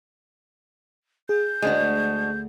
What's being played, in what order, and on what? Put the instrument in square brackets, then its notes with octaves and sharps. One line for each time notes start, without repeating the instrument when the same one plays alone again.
[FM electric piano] G#4 [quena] G6
[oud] D2 [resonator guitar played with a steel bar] G#3 D4 F#4